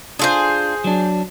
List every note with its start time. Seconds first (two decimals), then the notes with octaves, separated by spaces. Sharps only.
0.19 D4 F4 G#4 A4 C5
0.84 F#3 D4